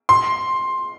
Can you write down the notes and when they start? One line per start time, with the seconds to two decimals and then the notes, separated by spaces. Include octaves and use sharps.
0.09 C6